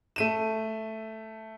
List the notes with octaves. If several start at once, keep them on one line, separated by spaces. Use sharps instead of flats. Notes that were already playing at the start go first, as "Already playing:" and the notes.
A3 D#7 E7